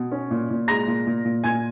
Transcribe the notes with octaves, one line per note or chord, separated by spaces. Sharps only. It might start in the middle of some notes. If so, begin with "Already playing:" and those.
Already playing: B2
C#4
A#2
A#2
G#3 A#5 A#6
A#2
A#2
A#2
A#2 G#5 G#6